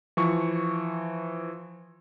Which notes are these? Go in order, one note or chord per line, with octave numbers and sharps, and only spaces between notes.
E3 F3 C#6